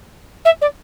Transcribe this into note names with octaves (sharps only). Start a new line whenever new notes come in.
E5
D5